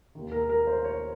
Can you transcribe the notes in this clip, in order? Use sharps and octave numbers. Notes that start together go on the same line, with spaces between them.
D#2 D#3
A#4
A#4
C5
C#5